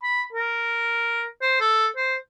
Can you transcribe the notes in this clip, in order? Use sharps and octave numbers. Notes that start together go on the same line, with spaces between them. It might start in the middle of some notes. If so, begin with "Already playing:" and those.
B5
A#4
C5
A4
C5